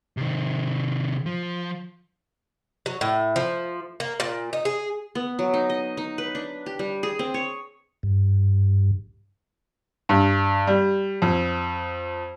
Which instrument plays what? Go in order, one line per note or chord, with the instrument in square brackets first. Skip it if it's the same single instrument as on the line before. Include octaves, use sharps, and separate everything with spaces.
[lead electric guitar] C3 D#3
F3
[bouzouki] F#3
A2
F3
A#3
A#2
D#4
G#4
[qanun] B3
F#3
D#4
D#5
D#4
B4
D4
G4
G3
G#4
C4
C#5
[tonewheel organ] G2
[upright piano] G2
G3
F2